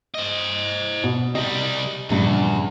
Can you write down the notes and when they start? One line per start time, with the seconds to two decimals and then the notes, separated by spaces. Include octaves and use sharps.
0.15 C5 D#5
1.04 B2
1.35 C3 G3 D#5
2.10 A#1 E2 G2 C#3